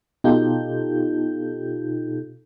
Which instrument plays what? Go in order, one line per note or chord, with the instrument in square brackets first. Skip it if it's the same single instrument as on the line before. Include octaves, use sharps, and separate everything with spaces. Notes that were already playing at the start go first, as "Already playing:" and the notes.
[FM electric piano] B2 D#4 F4 G4 A4 G6